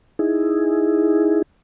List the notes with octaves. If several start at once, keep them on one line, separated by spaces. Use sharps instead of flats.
D#4 E4 G#4